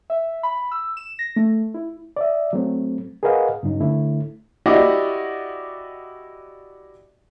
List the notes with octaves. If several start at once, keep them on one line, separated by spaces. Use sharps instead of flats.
E5
B5
E6
E7
A#6
A3
E4
D5 E5
F#3 A3 C4
G#4 A#4 B4 D#5 F5 F#5
G2 C#3 F#3 D#4
D3 A3 E4
E4 F#4 G4 D5 D#5